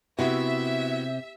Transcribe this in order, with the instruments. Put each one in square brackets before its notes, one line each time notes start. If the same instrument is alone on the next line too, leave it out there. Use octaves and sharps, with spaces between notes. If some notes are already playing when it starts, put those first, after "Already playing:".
[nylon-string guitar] C3 [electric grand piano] B3 E4 F#4 [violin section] E5